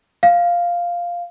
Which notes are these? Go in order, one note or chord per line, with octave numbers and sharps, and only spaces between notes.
F5